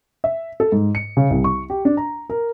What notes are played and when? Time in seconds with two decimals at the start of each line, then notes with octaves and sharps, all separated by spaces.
0.24 E5
0.60 A4
0.72 G#2
0.95 C#7
1.17 C#3
1.30 C2
1.44 C#6
1.70 G4
1.85 D4
1.97 A#5
2.30 A#4